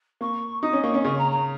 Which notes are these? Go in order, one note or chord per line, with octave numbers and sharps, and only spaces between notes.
A#3 C#6
D#4 D#6
C#4
A#3 C#6
C#4
C#3 C#6
A#5
A#5